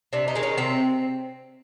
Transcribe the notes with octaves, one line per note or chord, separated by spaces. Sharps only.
C3 D4
D#4
D#3 G#3
C#4
C3 C4